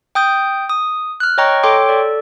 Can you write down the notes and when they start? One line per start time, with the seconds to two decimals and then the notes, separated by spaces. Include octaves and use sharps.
0.15 G5 D#6 G6
0.69 D#6
1.20 F6 F#6
1.38 C#5 D#5 G5 A#5 C#6
1.63 A4 C#5 G5 C6 D6
1.89 A4 D5